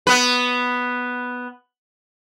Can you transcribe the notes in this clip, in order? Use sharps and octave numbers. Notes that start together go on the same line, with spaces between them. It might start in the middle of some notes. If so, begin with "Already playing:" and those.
B3 B4